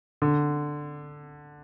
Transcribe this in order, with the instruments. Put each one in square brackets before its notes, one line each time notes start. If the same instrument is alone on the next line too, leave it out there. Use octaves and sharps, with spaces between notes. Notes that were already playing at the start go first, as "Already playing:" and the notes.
[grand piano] D3